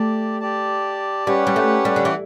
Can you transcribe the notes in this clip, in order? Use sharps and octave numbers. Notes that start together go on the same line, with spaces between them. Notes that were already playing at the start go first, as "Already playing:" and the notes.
Already playing: A3 G4 D5 A5
G4 D5 A5
G3 C#4 G4 B4 F#5
G3
A3
G3
D3
E3